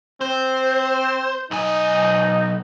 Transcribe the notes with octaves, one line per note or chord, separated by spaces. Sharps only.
C4 C5
B1 D#4 G#5